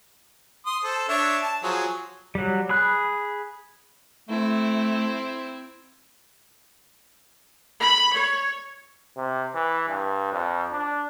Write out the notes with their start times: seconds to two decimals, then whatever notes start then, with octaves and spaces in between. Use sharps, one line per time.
0.66 C6 D#6
0.84 A4 C5
1.09 D4 C#5 E5
1.42 A5
1.63 F3 F#3 G#4
2.35 F#3 G3
2.69 G#4 B5 F#6
4.29 A3 C4 E4
7.80 B5
8.13 C#5
9.16 C3
9.54 E3
9.88 G2
10.33 F2
10.71 D4